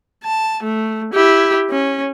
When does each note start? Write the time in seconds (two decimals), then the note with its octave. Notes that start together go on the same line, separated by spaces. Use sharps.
0.24 A5
0.63 A3
1.14 E4 G4
1.71 C#4